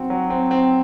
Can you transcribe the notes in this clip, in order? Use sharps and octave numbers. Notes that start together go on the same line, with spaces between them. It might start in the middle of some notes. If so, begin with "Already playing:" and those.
Already playing: F#3 C4 F#4
F#3
C4
C4